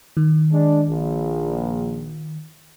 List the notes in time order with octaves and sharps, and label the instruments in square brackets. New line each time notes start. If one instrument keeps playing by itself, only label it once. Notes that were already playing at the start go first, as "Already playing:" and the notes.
[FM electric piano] D#3
[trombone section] G#3 D4
A#1